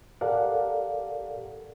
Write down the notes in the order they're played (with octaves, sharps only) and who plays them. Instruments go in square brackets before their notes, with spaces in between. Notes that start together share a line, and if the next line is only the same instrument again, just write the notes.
[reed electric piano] G4 A4 A#4 D5 F5 F#5